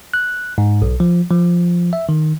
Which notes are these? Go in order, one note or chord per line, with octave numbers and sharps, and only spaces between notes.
F#6
G#2
B1
F3
F3
E5
D#3